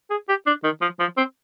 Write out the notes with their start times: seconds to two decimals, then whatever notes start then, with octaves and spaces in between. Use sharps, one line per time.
0.10 G#4
0.29 G4
0.47 D4
0.64 D#3
0.82 F3
1.00 F3
1.17 C4